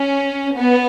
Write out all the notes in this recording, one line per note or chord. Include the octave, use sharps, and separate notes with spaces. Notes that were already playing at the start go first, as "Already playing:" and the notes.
Already playing: C#4
B3